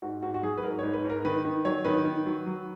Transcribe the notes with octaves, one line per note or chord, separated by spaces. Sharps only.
G#2 F#4
G#2 F#4
F#4
F#3 G#4
B4
G#2 A#4
G#2 C#5
B4
G#2
A#4
D#3 B4
D#3
F#3 C#5
D#3 B4
D#3
F#3
F#3